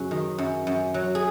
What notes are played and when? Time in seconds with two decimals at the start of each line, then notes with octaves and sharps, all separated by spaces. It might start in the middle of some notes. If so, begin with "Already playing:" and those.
Already playing: F#2 C#3 F#3 C#4
0.11 D#3
0.38 F#2
0.67 F#2
0.94 F#3
1.15 G#4